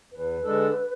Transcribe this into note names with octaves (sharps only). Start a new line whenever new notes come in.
E2 B4
D3 G#3 D4 A4